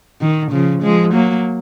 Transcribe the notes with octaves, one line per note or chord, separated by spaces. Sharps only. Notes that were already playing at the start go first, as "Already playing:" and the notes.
D#3
C#3 F3
F3 G#3
F#3 A#3